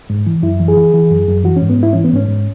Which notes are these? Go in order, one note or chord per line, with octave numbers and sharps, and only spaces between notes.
G#2
E3
F#2 E4
E3
G#4
E3
E3
F#2
F#2
E3 F#4
C#4
G#2
B3
G#2
E4
E3 C#4
B3
G#2 C#4
G#2